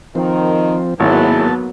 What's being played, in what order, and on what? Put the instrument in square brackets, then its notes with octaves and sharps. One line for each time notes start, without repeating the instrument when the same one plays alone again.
[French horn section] D#3 A#4 [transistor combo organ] F3 C4
[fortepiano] G#1 [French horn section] A2 E4 G#4 [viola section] F#3 A#3 B3 [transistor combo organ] A5